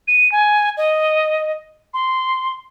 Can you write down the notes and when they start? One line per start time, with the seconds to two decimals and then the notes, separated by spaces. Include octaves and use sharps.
0.08 D#7
0.32 G#5
0.77 D#5
1.94 C6